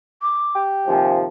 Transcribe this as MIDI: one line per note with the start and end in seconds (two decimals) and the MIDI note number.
0.22 0.62 86
0.55 1.15 67
0.88 1.28 39
0.88 1.28 48
0.88 1.28 53
0.88 1.15 80